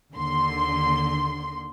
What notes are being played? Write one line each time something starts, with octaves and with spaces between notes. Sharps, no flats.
D#2 D3 C6